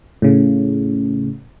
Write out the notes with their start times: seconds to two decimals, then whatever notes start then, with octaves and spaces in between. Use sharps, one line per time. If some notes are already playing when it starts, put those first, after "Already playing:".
0.22 A2 C#3